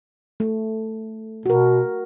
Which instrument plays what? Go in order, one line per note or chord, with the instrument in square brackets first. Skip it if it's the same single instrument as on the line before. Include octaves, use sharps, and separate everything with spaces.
[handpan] A3
[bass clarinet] B2 [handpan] F#4 A#4